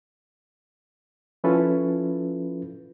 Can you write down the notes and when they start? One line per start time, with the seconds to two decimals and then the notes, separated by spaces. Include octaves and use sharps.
1.44 F3 C#4 E4 F4 A4 B4